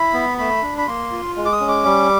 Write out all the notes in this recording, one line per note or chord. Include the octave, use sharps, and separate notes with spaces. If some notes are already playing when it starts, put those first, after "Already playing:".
Already playing: E4 B5
B3
A3 B5
D4
B5
A#3 C6
F4
G#3
D6
D#6
C#4
D6
G3